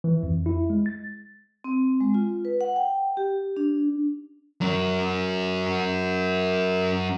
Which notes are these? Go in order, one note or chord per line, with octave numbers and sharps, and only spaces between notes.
E3
F2
E4
G#3
A6
C4
G#3
F4
B4
F#5
G5
G4
D4
F#3 C#4